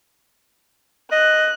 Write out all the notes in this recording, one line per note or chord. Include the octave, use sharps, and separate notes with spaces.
D#5 F#6